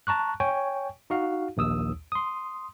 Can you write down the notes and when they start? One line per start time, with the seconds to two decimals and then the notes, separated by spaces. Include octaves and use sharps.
0.07 A5 A#5 C#6 F#6
0.40 C#5 G5 G#5 C#6
1.10 D#4 F#4 F5
1.57 A#1 D#2 D#6 E6
2.12 C6 D#6